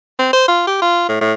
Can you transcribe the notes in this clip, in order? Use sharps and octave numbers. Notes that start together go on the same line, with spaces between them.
C4
C5
F4
G4
F4
A2
A2